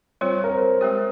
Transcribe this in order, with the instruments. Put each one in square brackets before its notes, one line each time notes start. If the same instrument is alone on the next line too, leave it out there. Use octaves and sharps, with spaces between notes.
[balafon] G3 C4 F4 C5 [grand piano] C#5
[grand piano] A#4
C5
[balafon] G#3 C4 G4 C#5